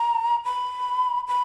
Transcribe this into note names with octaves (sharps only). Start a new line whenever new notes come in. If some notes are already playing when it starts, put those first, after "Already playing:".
Already playing: A#5
B5
B5